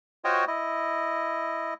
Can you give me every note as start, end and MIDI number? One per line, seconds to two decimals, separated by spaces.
0.24 0.45 65
0.24 0.45 66
0.24 0.45 72
0.24 0.45 73
0.24 0.45 75
0.24 0.45 79
0.47 1.74 64
0.47 1.74 75